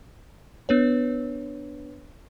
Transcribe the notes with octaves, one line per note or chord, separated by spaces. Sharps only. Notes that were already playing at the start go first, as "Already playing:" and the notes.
B3 D4 B4 C#5